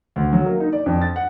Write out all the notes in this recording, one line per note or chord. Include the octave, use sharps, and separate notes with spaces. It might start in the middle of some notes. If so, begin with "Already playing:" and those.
D2
F#3
A#3
D#4
D5
F2
A6
F#5